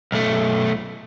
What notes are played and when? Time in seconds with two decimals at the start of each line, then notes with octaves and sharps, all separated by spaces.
0.12 B1 A3